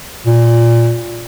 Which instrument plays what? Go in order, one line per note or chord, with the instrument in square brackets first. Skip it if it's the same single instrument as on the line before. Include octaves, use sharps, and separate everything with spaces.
[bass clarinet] A#2